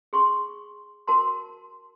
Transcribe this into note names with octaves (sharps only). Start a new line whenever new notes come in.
G#4 C6 C#6
F#4 A#4 A5 C6